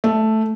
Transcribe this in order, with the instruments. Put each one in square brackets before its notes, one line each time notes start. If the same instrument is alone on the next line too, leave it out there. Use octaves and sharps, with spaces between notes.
[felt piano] A3